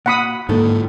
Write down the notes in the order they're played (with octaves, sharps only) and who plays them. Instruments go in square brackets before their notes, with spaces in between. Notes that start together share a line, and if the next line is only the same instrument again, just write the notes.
[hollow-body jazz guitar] A#2 F#4 [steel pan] F#5 B5 D#6
[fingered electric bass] G#2 A#3 [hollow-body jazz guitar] D3 D#3 A4